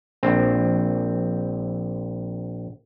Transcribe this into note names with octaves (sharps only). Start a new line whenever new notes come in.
A#1 C4